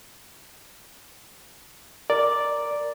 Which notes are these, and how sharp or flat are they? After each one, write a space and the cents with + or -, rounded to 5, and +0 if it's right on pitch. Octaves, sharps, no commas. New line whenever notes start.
A#4 +0 D5 +0